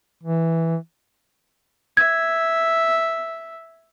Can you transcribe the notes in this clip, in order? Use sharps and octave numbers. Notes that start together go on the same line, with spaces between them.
E3
E5 G#6